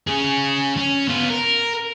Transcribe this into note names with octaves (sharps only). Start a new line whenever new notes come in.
C#4 G#4
C#4
B3 F4
A#4